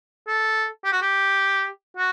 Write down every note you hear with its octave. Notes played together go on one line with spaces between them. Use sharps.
A4
G4
F#4
G4
F#4